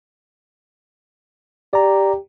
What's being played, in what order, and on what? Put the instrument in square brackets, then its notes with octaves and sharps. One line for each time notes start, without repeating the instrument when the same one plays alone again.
[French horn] G4 [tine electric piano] D5 A#5